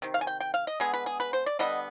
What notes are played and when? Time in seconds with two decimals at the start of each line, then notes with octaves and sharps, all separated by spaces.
0.02 C3 D#3
0.14 F5
0.21 G#5
0.27 G5
0.40 G5
0.54 F5
0.67 D#5
0.80 D3 G#3 B3 G#4
0.94 B4
1.06 G#4
1.20 B4
1.33 C5
1.46 D5
1.59 D3 G3 B3 D#5